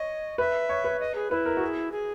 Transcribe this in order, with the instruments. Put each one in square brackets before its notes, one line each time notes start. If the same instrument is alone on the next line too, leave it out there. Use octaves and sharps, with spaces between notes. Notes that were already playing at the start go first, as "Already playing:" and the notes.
Already playing: [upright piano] C#5 [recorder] D#5
[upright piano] B4 [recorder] E5
[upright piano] C#5
B4
[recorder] D#5
G#4
[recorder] E4 [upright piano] B4
[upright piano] A#4
F#4
G#4
[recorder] G#4